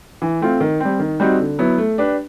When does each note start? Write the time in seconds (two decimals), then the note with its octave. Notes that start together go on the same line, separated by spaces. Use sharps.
0.22 E3
0.41 A3 C4 F4
0.60 D#3
0.80 G3 C4
0.99 D#3
1.20 G3 C4 D#4 F#4
1.39 D3
1.59 F#3 B3 E4
1.78 A3
1.98 D4 G4 B4